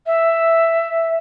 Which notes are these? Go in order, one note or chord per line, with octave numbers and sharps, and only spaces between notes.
E5